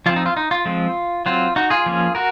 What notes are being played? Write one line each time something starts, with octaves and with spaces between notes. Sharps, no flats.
F3 C4 F4
D#4
F4
D#4
F4
F3 G#3 C4
F#3 C4 F4
D#4 F#4
F4 G#4
F3 A#3 C#4
F#4 A#4